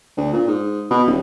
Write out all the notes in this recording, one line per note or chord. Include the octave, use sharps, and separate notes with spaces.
D2
A#2
G#2
B2
D#1